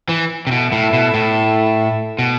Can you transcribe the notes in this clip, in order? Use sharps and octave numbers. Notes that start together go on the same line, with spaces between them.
E3
C3
B2 E4 A4 E5
A2
B2
A2
B2